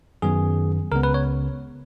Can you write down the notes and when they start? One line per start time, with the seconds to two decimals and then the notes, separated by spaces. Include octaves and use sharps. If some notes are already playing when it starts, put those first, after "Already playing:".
0.22 F#2 D#3 F#3 B3 G#4
0.92 C#2 C#3 G#3 B3 A#4
1.03 B4
1.14 C#5